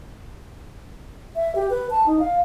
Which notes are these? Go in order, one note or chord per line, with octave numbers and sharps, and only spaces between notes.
E5
G4
B4
A5
D#4
F5